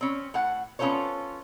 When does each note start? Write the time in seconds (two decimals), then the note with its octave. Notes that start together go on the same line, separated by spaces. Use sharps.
0.01 C4 C#4
0.34 A2 F#5
0.79 B3 C#4 F4 A4 C5 C#5